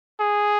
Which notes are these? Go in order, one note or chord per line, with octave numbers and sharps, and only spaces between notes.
G#4